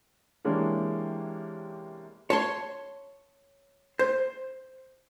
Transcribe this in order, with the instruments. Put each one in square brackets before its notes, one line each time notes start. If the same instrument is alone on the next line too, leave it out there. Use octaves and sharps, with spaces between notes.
[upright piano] C3 E3 G#3 A#3 C#4 D4
[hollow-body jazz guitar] C#5 A5 C6
C5